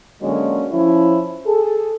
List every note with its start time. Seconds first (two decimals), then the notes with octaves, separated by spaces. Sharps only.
0.22 D3 F#3 G#3 A#3 C#4
0.72 F3 C#4 E4
1.46 G#4 A4